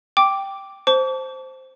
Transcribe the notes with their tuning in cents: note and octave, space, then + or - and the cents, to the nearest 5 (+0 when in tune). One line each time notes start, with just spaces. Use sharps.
G5 +0 D6 -5
C5 +0 A5 +0 D6 -45